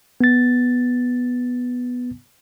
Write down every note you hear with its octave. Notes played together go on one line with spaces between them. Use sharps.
B3 A6